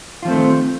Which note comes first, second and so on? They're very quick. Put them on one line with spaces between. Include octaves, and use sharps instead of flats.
F4 F3 C4 A3 D#3